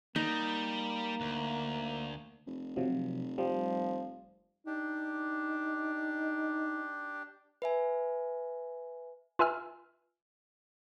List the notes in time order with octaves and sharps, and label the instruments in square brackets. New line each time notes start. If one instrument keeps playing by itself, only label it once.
[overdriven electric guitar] G3 [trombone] A#3 [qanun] D#4
[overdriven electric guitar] D2
[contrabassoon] F1
[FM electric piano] C3 F3 F#3
[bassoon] F3 [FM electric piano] G3
[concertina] D4 G4 [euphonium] D#4
[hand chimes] B4 E5 G#5
[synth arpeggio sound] F4 B4 E5 G#5 E6 F6